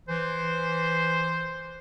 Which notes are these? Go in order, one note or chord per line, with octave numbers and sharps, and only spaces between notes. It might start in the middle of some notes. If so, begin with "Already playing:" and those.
E3 C5